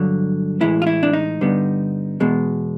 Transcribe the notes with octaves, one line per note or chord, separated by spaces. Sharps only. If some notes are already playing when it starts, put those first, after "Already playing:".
Already playing: G2 D3 F#3
A2 E3 G#3 E4
F4
E4
D4
D#4
G2 D3 G3 B3
E2 B2 G#3